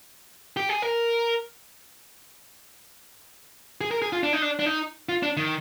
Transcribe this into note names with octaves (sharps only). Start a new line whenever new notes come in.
G4
G#4
A#4
G#4
A#4
G#4
F4
D4
D#4
D4
D4
D#4
F4
D4
D#3